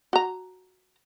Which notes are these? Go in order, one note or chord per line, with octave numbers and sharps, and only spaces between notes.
F#4 A#5